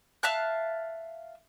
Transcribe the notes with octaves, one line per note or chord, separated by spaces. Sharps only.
E5 F5 A5 F#6